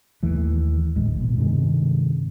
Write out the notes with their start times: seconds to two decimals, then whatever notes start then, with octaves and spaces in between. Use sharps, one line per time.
0.23 D#2 E3 A3
0.96 D1 A1 G#3
1.21 B2
1.38 G2 C3 D#3 G#3